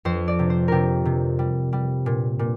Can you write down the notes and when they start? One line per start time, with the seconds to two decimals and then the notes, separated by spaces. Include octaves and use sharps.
0.05 F2 C5
0.28 D5
0.39 C3
0.50 C5
0.68 C3 G4 A#4
1.05 C3
1.39 G3
1.73 G3
2.06 A#2
2.39 A#2